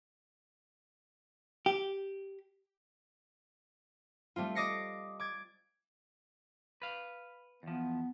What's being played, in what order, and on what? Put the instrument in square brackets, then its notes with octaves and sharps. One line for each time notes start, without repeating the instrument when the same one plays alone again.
[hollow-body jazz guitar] G4
[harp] G3 A3 C4 F4
D#5 D6 D#6 A#6 C7 C#7
D6 G#6 A6
[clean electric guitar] B4 F5
[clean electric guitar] E2 F3 [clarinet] B3